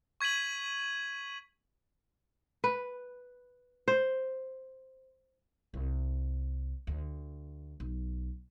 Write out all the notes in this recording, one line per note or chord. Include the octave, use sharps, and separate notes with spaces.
C#6 G#6 B6 D#7 F#7
B4
C5
C2
D2
B1